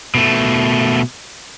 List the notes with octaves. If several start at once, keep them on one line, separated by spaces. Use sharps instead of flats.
B2 A3